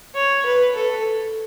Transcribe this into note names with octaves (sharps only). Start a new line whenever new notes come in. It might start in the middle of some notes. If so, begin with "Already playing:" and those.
C#5
B4
A4